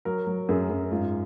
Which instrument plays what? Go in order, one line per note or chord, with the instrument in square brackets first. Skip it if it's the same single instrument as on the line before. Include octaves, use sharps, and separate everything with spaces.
[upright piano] F#3 A#4
F#3
F#2 G#4
F#2
G#2 F4